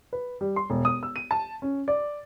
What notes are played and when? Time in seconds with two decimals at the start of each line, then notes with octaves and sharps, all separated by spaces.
0.13 B4
0.41 G3
0.56 C6
0.70 E1
0.85 D#6
1.03 E6
1.16 D#7
1.31 A5
1.62 C#4
1.88 D5